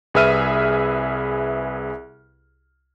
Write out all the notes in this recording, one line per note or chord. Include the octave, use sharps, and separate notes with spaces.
C2 G#4 B4 E5 F6 D#7